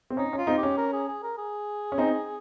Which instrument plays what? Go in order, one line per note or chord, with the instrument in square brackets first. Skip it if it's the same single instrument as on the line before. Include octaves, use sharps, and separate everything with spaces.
[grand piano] C4
[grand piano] C#4 [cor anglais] D#4
[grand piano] C#4
[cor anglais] F4
[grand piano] C4 D#4
[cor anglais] G4
[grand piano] C#4
[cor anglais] A#4
G#4
G#4
A#4
G#4
[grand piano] C#4
C4 D#4